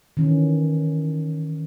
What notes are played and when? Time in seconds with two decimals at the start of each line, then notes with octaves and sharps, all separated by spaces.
0.17 D#3 E3 C#4